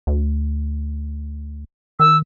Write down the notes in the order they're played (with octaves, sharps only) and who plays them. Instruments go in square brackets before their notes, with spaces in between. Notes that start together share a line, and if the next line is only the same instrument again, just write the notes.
[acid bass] D2
[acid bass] D#3 [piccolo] E6